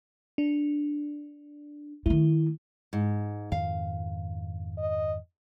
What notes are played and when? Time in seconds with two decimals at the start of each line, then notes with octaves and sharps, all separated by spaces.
0.38 D4
2.06 D#3 A3 E4
2.93 G#2
3.52 F2 G#2 D#3 F5
4.78 D#5